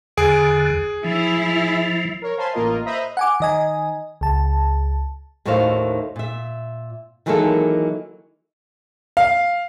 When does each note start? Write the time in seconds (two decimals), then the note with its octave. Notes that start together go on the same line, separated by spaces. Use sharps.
0.18 E2 D3 G#4
1.04 F3 E4
2.22 A#4 C#5
2.37 C5 F5 G#5 A5 B5 C6
2.53 A1 A#3 F4 A#4 D#5
2.85 B4 C5 D#5 E5 A#5 B5
3.17 F#5 G#5 D6
3.40 D#3 D#5 G#5
4.21 C#2 A5
5.45 D#2 A2 D#3 F#4 C5 F5
6.16 A#2 E5
7.26 D#3 E3 F#3 G#3 A#3 A4
9.17 F5